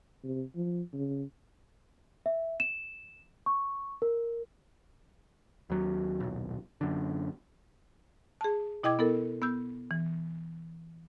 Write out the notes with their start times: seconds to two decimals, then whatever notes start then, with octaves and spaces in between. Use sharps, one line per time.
0.23 C3
0.55 F3
0.93 C#3
2.26 E5
2.60 E7
3.46 C#6
4.02 A#4
5.70 D#2 F#3
6.20 D#1 B1
6.81 F#2 D3
8.41 G#4 A5
8.83 B2 E4 D#5 G5 D6 G#6
8.99 B3 E4 A4 A#4
9.42 B3 E6 G6
9.91 E3